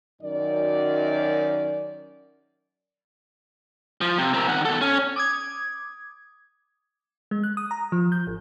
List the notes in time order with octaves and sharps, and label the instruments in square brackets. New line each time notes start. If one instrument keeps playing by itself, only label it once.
[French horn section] F#2 D#3 D5
[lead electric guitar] F3
C3
C4 A#4
D#3 F#5
B2 A4
C#4
[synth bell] D6 D#6 G#6
[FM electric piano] G#3
F#6
D#6
A#5
F3
G6
A1